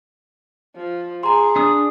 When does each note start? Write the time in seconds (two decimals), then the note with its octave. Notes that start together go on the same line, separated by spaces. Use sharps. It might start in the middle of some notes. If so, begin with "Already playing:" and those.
0.76 F3
1.23 G#4 A#5 C6
1.56 D4 D#6